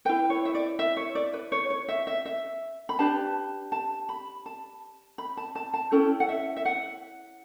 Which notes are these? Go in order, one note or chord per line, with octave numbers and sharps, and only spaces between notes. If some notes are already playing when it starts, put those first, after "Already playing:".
E4 B4 G5
C#5
E5
D5
E5
C#5
D5
B4
C#5
C#5
E5
E5
E5
B5
D4 G4 B4 A5
A5
B5
A5
B5
A5
A5
A5
C#4 E4 A4 G5
F#5
E5
E5
F#5